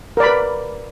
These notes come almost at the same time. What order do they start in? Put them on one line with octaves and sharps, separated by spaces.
A#4 D5 B5 B4